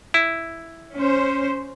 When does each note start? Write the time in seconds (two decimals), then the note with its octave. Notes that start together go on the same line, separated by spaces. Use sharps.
0.14 E4
0.95 C#4 C5